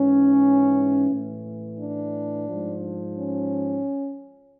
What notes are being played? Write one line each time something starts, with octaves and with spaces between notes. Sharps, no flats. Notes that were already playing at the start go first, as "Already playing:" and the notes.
Already playing: G#2 E3 C#4
A2 E3
D4
F3
G#2
C#4